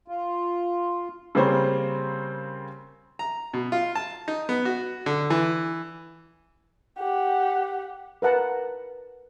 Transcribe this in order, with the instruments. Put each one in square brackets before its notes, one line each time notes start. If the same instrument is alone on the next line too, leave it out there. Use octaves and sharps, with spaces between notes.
[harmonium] F4
[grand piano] C#3 G3 A#3 C4 C5 C#5
[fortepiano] A#5
B2
F4
A5
D#4
B3
F#4
D3
E3
[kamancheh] G4 F#5
[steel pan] A#4 B4 F#5 A5 A#5